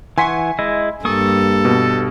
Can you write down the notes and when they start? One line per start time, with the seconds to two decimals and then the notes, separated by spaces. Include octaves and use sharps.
0.18 E3 F#5 G#5 C6 C#6 B6
0.59 G#3 E4 D#5
1.05 G2 A#3 A4 C#6 D#6
1.65 B2